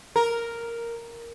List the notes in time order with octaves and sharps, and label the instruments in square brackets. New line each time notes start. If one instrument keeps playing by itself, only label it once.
[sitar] A#4